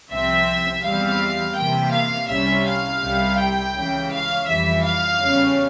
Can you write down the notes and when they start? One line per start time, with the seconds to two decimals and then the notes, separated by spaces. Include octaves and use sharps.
0.11 C2 C3 F3 C4 E5
0.83 E2 E3 G3 C4 F5
1.56 C3 E3 A#3 G5
1.92 F5
2.29 C2 C3 G3 C#4 E5
2.65 F5
3.02 C2 C3 G3
3.38 G5
3.74 C#2 C#3 E3
4.11 F5
4.47 F2 E3 G3 E5
4.83 F5
5.20 E2 C#3 G3 C#4